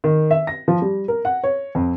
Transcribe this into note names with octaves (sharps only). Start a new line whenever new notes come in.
D#3
E5
A#6
F3
G3
A#4
F#5
C#5
F2